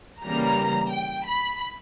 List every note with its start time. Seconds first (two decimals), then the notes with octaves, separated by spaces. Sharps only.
0.23 C#3 E3 G3 A#3 A#5
0.92 G5
1.26 B5